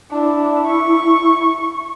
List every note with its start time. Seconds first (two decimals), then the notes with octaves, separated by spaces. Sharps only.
0.11 D4 E4
0.67 C#6